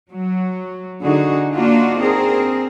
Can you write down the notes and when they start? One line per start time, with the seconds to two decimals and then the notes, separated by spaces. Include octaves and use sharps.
0.11 F#3
1.02 D3 D#4 F#4 G#4
1.54 A#3 D4 D#4 F4 F#4
1.99 C4 G#4 A#4